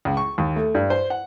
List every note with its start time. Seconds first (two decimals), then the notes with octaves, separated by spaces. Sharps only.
0.05 C#2
0.17 C#6
0.38 D#2
0.56 A3
0.75 G2
0.90 C5
1.10 F#5